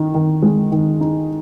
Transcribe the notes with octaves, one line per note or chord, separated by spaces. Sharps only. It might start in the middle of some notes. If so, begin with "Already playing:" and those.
Already playing: D#3 D#4
D#3
G#3
D#3
D#4